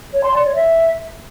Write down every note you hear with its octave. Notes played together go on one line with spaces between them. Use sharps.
C#5
C6
D5
C#5
E5